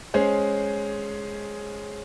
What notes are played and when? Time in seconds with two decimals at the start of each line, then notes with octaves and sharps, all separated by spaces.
0.14 G#3 C#4 G#4 C5